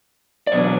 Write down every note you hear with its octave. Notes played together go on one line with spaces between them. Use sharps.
D5
E2 B2 F#3 B3 D4 C#5